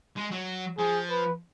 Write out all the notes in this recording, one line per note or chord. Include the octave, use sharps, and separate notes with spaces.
G#3
F#3
F3 G#4
B4